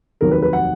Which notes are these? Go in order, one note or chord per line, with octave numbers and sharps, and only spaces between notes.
F1 D#2 D#3 F#3 A#4
B4
B4
F#5